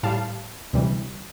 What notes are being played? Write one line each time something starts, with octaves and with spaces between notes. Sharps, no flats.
A2 G3 F5 A5
D2 C3 E3 G3